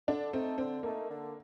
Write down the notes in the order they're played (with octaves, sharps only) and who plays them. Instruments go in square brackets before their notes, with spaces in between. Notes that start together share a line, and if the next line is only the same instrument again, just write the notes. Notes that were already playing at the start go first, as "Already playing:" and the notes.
[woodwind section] D3 [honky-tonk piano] D4
[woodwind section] A3 D#4 A4 [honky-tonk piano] C4
[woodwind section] D3 [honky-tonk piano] C4
[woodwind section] A3 D#4 A4 [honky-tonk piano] A#3
[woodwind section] D3